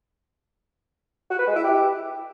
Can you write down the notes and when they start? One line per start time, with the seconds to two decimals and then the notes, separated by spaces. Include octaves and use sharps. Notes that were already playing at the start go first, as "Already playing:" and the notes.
1.31 F#4
1.39 B4
1.47 G#3
1.56 E4
1.64 G4